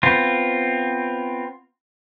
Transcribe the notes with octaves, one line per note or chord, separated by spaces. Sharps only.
B3 C4 F4